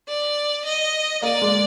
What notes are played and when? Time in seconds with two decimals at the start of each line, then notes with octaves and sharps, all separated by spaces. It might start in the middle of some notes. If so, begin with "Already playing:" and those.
0.08 D5
0.65 D#5
1.22 A#3 D5
1.42 G#3